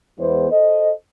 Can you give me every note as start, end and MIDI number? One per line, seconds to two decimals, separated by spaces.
0.19 0.50 40
0.19 0.50 52
0.19 0.50 56
0.19 0.50 59
0.19 0.50 72
0.51 0.91 69
0.51 0.91 72
0.51 0.91 75